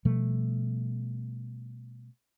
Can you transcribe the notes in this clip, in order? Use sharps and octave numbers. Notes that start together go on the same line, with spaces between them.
B2 F3 G3 A3